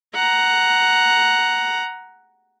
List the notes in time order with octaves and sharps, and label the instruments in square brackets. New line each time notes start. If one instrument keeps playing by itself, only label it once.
[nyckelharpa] F#5 A#5